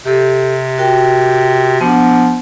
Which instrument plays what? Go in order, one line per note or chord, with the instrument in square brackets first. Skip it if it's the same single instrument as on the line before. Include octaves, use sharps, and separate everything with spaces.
[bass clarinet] C3 [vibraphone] G4 A4
[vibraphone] F#4 A#4 G5
[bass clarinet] F3 [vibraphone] B3 D4 F#5